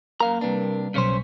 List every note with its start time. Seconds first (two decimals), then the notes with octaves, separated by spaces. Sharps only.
0.20 F#2 A#3 F5 A#5
0.41 C3 G3 D4 B4
0.94 B1 C#3 C#4 C5 C#6 B6